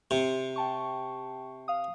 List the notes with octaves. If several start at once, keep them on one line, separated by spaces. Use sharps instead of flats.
C3
G5 A5 C#6
F5 D#6